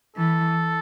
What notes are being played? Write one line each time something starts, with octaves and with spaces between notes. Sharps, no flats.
E3 A4